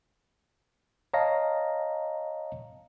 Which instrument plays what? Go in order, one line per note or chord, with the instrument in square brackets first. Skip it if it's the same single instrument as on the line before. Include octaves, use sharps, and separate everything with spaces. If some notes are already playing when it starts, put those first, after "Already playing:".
[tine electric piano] C#5 D#5 F5 A5 A#5 A#6